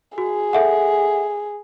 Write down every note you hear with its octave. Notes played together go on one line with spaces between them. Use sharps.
F#4 G#4
A4 E5 F#5